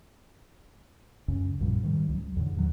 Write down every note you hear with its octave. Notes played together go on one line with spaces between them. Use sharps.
C#2 F#2 C#3 C#4
A#1 F#2 A#2 G3
G#2 D#3 E3 G3
C#2 F#3
E2 A2 D3
D#2 D3 E3 F#3